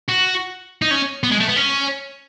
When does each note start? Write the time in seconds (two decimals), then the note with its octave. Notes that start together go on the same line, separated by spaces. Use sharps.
0.09 F#4
0.82 D#4
0.91 C#4
1.24 B3
1.32 G#3
1.40 A3
1.48 B3
1.56 C#4